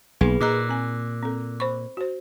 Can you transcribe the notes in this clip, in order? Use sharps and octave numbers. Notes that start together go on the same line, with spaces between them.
B1 A#3 D#4 G#4 B4
A#2 G#4 D#5 A#5 D6 E6 F#6
C4 G#5
C4 A4
C5 B5 C#6
F#4 C5